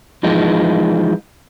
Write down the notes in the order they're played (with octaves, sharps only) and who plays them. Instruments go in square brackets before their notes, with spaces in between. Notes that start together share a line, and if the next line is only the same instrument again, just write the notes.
[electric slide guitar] E3 F3 G#3 D#4